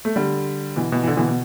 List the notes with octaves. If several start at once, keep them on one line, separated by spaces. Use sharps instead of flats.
A3
D3 G3
B2 E3
B2 E3
E3
D3
B2 E3
B2